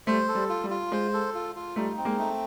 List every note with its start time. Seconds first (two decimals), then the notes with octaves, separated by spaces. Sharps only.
0.07 G3 A3 C5
0.28 A4
0.35 G3
0.49 F4
0.64 G3
0.70 F4
0.92 G#3 C5
1.14 A4
1.35 F4
1.56 F4
1.76 G3 A3 D#4
1.98 C4
2.05 G#3 A#3
2.19 A3